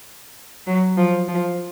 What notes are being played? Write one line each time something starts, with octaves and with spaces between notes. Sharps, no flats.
F#3
F3
F3